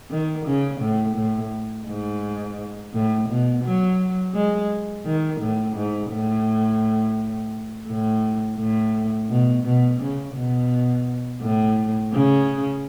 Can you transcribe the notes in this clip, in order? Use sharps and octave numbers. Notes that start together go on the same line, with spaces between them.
D#3
C#3
A2
A2
G#2
A2
B2
F#3
G#3
D#3
A2
G#2
A2
A2
A2
B2
B2
C#3
B2
A2
C#3